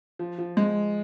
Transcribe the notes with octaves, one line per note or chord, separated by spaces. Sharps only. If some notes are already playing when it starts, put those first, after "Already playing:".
F3
F3
G#3